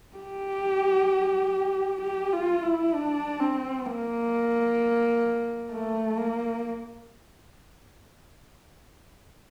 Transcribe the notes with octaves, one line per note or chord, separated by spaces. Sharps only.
G4
G4
F4
E4
D4
C4
A#3
A3
A#3